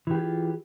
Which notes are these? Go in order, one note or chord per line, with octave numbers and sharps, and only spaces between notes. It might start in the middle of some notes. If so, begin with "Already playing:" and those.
E3 F4 G4 G#4